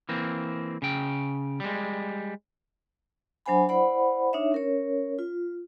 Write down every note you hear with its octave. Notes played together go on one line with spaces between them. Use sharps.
E3 A#3 C4
C#3 G5
G3 G#3
F#3 D4 C5 F#5 G#5 B5
E4 C5 D5 F#5 B5
D4 D#4 C#5 E5
C#4 A#4 C#5
F4